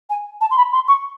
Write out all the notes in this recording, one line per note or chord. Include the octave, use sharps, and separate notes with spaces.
G#5
A5
C6
B5
C6
C#6